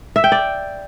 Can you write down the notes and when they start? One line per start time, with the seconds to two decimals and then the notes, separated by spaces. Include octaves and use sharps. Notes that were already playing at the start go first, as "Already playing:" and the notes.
0.16 E5
0.24 G5
0.32 D5